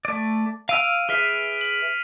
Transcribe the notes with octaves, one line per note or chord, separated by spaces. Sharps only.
A3 D5
F5 E6 F6 D7 D#7 F7
G#4 B4 E5 F6 B6 C7
F#7